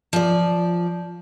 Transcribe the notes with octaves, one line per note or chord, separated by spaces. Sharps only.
F3 D5